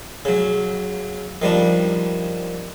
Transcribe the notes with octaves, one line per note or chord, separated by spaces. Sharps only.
C#3 F#3
D#3 F3 G3 D4